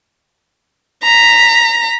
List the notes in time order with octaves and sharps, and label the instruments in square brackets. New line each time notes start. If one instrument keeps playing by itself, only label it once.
[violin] A#5 B6